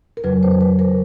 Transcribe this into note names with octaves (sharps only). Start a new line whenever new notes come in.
A#4
F2 C#3 F#3 B4
C5
B4
A#4